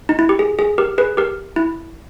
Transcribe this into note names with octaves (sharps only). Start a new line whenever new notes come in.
D#4
E4
G4
G#4
G#4
G4 A#4
G#4 B4
G4 A#4
E4